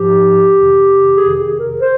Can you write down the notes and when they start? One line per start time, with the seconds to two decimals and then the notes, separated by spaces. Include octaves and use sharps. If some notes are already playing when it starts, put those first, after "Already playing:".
Already playing: G#2 F3 G4
0.54 F2 C3 D#3
1.16 F2 C3 D#3 G#4
1.29 G4
1.38 G#4
1.59 A#4
1.80 C5